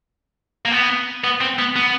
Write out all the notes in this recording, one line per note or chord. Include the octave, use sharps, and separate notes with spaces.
A#3
B3
B3
C4
B3
B3